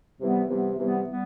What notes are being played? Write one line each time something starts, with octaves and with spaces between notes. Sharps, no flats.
C3 E3 G3 B3
C3 E3 G3 B3
C3 E3 G3 B3
G3 B3